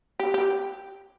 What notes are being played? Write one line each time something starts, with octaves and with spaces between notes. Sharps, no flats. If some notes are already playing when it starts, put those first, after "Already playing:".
G4
G4